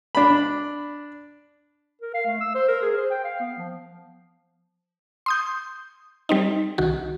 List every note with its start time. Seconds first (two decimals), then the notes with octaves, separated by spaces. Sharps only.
0.15 D4 B5
2.02 A#4
2.14 F5
2.26 A3
2.41 E6
2.55 C5
2.68 A#4
2.82 G#4
2.97 C5
3.10 G5
3.24 F5
3.40 B3
3.58 F3
5.26 C6 D#6 G6
6.29 G3 C4 D#4
6.78 C2 D#3 F#4